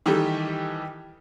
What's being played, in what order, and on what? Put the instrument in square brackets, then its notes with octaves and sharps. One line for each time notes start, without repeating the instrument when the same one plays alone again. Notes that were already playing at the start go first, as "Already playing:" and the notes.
[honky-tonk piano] D#3 E3 G3 D#4 G4 A4